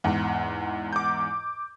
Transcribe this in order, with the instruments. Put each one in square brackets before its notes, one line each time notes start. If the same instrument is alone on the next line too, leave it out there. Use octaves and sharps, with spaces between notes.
[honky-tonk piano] E2 G#2
[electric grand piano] D6 G6